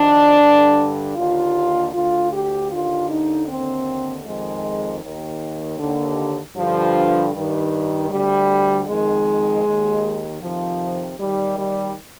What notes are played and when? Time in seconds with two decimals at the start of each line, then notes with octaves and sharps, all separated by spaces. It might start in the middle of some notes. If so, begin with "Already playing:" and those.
Already playing: F2 D#3 D4
0.40 G2 D3
1.16 D#2 D3 F4
1.94 D2 D3 F4
2.32 G4
2.71 D#2 D3 F4
3.09 D#4
3.48 D#2 D3 C4
4.25 F2 D#3 G#3
5.02 D#2 D#3
5.79 D#2 D3
6.56 G2 D3 F3
7.34 G2 D#3
8.10 D2 D3 G3
8.87 F2 D#3 G#3
9.64 D#2 D#3
10.41 F2 C3 D#3 F3
11.18 D#2 D#3 G3
11.57 G3